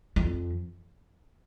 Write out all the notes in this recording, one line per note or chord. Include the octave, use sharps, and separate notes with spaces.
F2